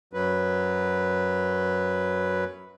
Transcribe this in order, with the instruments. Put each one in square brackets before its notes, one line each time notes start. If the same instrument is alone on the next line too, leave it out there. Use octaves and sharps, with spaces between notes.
[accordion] F#2 F#3 B4